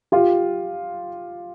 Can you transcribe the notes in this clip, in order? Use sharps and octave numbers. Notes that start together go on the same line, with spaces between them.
F4 G4